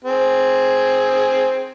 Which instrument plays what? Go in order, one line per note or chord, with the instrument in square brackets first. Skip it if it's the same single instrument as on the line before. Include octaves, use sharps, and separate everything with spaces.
[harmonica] C4 G#4